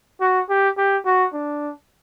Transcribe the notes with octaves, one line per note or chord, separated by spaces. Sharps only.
F#4
G4
G4
F#4
D4